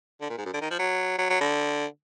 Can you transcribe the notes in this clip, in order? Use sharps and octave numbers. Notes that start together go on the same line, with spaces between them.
D3
A#2
G#2
F#2
D3
D#3
F3
F#3
F#3
F#3
D3